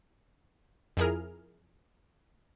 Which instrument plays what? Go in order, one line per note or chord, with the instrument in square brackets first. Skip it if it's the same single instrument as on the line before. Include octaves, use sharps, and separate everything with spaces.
[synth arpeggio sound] F2 F3 E4 G#4 A#4 F6